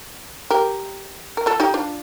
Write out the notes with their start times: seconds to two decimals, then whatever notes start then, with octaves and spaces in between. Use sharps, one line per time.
0.50 G4 A#4
1.37 A#4
1.46 F4 A4
1.60 D#4 G4
1.74 D4 F4